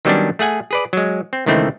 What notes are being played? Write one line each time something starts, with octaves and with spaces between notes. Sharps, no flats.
D#3 F#3 G3 B3 C#4 D4
A3 G#4 F#5 G#5
G#4 B4 D5
F#3 G#3
C4
C#2 D#3 E3 A3 C4